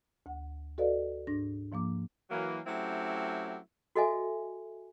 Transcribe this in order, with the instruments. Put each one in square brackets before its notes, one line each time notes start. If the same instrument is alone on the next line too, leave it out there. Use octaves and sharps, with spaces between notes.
[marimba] D2 F#5
F#4 A4 B4 D5 D#5 F5
G#2 D4 A#6
G#2 F3 A#3 D6
[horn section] E3 F#3 A#3
F#3 A3 C4 C#4 E4 G4
[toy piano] F#4 A4 D#5 E5 G#5